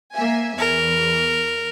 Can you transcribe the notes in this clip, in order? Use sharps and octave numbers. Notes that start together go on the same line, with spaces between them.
A#3 E5 G#5
E2 A#4